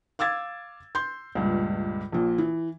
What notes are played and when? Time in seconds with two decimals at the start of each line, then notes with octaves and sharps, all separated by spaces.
0.19 F5 D6 E6 G#6 A6
0.95 C6 G6
1.35 C#2 G2 A#2
2.12 A#1 A#2
2.38 E3